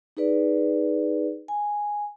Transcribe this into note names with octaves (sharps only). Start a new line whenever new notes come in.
D#4 G#4 B4 D5
G#5